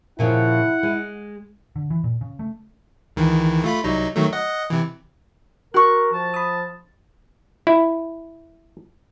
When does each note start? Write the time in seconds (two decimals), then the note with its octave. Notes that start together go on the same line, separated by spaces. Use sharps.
0.19 A#2 C#3 F3 E4 F#5
0.83 G#3
1.76 D3
1.90 E3
2.04 A#2
2.21 C#3
2.39 A3
3.16 C#2 D#3 E3
3.64 A3 F4 B5
3.84 C2 F#3 D#4
4.16 D#3 F#3 A3
4.33 D#5 F#5
4.70 C3 E3
5.74 F#4 A#4 C6 C#6 F#6
6.12 F3 A5
6.34 B5 D#6
7.67 E4